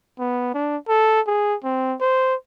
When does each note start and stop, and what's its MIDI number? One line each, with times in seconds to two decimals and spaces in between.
0.19 0.51 59
0.54 0.77 62
0.88 1.21 69
1.27 1.55 68
1.64 1.95 60
2.01 2.35 72